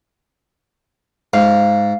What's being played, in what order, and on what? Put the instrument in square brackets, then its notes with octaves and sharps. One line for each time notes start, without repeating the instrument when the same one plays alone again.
[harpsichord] G#2 [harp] F5